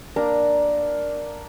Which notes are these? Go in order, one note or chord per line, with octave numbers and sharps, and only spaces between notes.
A#3 D4 A#5